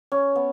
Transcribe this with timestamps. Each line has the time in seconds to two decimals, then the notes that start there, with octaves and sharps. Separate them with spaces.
0.12 C#4
0.36 B3